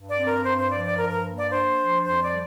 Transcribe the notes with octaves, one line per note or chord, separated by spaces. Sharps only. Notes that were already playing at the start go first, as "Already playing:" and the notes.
Already playing: G2
D5
C4
A#4
G2 C5
C5
F3 D5
D5
G2 A#4
A#4
A#3
D5
D4 C5
F3
F2 C5
D5
G3